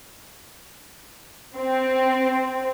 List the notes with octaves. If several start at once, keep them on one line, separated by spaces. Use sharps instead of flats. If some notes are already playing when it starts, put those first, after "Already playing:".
C4